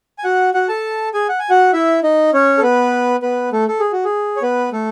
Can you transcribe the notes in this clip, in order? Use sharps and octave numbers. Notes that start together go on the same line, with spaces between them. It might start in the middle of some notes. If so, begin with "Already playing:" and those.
G#5
F#4 F#5
F#4 F#5
A4 A5
G#4 G#5
F#5
G#5
F#4 F#5
E4 E5
D#4 D#5
C#4 C#5
A4
B3 B4
B3 B4
A3 A4
A4
G#4
F#4
G#4
C#5
B3 B4
A3 A4